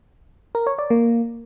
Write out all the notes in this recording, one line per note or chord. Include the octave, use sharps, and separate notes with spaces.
A#4
C#5
D5
A#3